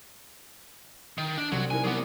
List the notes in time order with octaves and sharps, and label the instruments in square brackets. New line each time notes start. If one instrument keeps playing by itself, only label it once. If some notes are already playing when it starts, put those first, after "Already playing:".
[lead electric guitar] D#3
D4
[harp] C2 [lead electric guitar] F#3
[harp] D#4 E4 A#4 [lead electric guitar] G#5
[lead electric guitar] F#3 B3 [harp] F#5 D6 D#6